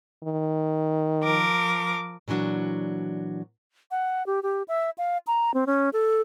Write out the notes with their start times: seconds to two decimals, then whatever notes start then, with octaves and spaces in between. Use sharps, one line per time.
0.23 D#3
1.23 F3 A#4 D6
2.28 A#2 E3 F#3 D4 F#4
3.91 F#5
4.26 G4
4.43 G4
4.68 E5
4.98 F5
5.27 A#5
5.54 C4
5.67 C#4
5.93 A4